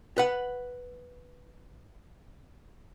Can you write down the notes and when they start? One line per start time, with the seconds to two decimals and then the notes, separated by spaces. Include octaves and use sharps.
0.18 B4 F#5